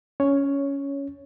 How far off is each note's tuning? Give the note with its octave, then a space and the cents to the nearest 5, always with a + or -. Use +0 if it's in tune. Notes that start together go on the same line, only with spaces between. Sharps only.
C#4 +10 C#5 +0